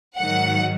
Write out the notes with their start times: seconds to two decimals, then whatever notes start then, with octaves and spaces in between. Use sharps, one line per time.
0.19 G#2 D#3 F#3 F#5